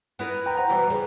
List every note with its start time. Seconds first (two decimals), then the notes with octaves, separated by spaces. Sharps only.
0.19 B3 E4 A#4
0.46 G5 A#5
0.57 C5 F#5 A#5
0.69 B2 E3 G3
0.90 C#3